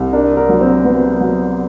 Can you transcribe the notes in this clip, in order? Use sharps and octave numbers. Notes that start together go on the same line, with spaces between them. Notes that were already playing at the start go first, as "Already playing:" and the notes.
Already playing: C2
D4 A#4
A#4
F#3
C4 C5
F#3 B3 B4
F#3